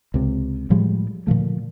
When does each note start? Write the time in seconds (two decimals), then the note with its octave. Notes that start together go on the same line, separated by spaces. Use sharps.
0.14 C#2 C3
0.70 A2 F3 G3 G#3
1.27 A#2 D3 F3 A3